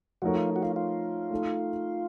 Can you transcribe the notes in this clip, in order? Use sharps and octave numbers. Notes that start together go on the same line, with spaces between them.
F3 A3 D#4 F#4 A#4 C#5
F4
F#4
F4
F4
A3 D#4 A4